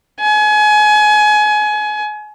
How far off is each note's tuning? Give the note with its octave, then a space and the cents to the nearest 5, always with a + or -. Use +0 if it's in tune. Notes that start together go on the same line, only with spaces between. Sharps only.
G#5 +30